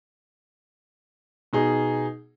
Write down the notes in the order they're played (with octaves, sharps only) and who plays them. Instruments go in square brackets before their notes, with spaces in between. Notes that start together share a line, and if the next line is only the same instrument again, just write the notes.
[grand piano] B2 D#4 G#4